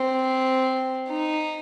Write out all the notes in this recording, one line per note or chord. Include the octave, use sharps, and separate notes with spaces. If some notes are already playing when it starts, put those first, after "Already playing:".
Already playing: C4
D#4